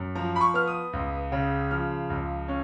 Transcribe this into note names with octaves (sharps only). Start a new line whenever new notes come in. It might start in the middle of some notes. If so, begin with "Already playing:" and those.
Already playing: F#2
F3 A#5
B5
C#6
B3 F6
D#6
C#2
C#3
F3 F6
C#2
C#4